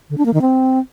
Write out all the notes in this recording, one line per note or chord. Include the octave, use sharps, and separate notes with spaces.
D3
D4
A#3
D#3
C4